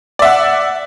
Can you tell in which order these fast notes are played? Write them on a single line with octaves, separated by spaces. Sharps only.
D5 E5 F#5